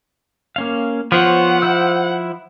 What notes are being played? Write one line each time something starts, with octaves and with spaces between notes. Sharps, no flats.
A#3 C#4 F5
F3 B3 C5 C#5 F#5
E4 C5 E6